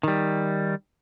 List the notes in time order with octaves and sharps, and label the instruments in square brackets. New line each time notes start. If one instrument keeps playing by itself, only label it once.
[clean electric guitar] D#3 G3